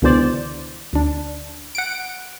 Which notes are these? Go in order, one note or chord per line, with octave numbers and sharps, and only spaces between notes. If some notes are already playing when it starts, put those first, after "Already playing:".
C#2 B2 D3 E3 C5 D5
D2 D4
F#5 D7